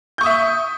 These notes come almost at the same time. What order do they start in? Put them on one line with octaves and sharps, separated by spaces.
G6 C#6 D#6 E5